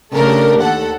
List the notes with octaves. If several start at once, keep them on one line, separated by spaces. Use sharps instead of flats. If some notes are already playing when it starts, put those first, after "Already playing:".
C#3 A3 D4 G4 A4 A#4
D#2 A4 F#5